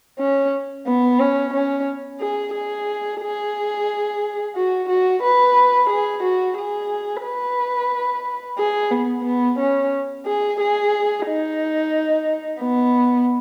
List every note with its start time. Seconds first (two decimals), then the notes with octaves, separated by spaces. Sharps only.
0.19 C#4
0.86 B3
1.19 C#4
1.53 C#4
2.21 G#4
2.54 G#4
3.21 G#4
4.55 F#4
4.89 F#4
5.23 B4
5.89 G#4
6.23 F#4
6.57 G#4
7.23 B4
8.58 G#4
8.91 B3
9.24 B3
9.59 C#4
10.26 G#4
10.60 G#4
11.27 D#4
12.60 B3